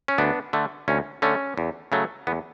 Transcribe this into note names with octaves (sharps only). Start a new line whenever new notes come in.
C#4
D2 B3 D4
D3 A3
D2 C#4
D3 A3 C#4
E2
C#3 F#3 A3
E2 B3